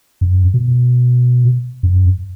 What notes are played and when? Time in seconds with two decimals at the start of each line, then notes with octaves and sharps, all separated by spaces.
0.21 F#2
0.54 B2
1.83 F#2